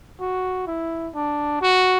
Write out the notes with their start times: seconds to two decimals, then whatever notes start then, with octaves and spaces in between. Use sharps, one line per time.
0.20 F#4
0.67 E4
1.15 D4
1.61 F#4